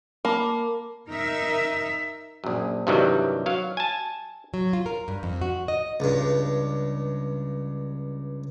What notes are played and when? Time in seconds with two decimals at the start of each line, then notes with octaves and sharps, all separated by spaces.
0.25 A#3 A5 B5 D6
1.08 D#4 A#4 E5
2.44 A#1 F#2
2.87 G2 C3 D#3 E3 F#3 G3
3.46 F#3 F5
3.77 G#5 A5
4.54 F#3
4.73 F4
4.86 A#4
5.08 G2
5.23 F2
5.41 F#4
5.68 D#5
6.00 C#2 G2